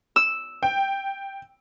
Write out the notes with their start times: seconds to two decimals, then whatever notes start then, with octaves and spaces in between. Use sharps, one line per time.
0.16 E6
0.63 G5